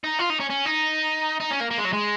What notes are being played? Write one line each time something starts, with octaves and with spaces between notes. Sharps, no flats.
D#4
F4
D#4
C#4
C#4
D#4
D#4
C#4
A#3
A#3
G#3
F#3
G#3